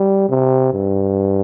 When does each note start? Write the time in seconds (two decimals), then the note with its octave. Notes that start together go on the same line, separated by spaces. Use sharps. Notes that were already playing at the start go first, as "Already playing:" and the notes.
Already playing: G3
0.29 C3
0.73 G2